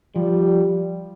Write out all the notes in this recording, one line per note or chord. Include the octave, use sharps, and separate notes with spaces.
F3 G3